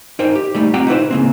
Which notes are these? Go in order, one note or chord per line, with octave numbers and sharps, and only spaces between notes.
D#4 A#4 C5 G5
G4
G3 A3 D#4
C4 F4 G4 F#5 G5 A#5
D#4 E4 B4 C5
C#3 A#3 C4